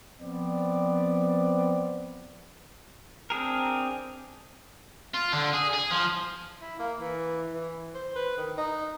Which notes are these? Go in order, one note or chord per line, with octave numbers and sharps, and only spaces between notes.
F3 B3 C4 D5
C4 D4 G#4 A#4
F4
D3
G#4
G#4
F3
E4
A#3
E3
E3
C5
B4
D#3
D#4